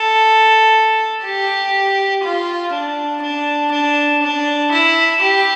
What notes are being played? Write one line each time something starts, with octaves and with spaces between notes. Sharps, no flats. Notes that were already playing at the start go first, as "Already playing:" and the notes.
Already playing: A4
G4
F4
D4
D4
D4
D4
E4
G4